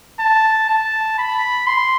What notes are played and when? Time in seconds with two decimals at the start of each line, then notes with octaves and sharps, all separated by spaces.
0.20 A5
0.69 A5
1.18 B5
1.67 C6